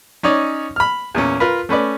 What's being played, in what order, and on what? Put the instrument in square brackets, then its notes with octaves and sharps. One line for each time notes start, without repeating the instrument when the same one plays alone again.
[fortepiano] C#4 D#4 C#5 D5
B5 F6
E2 A#2 C#4
F4 A#4 B4
A3 C#4 B4 D5